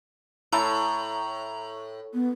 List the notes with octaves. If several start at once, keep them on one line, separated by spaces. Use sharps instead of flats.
A2 A3 E4 A4 A#5
B3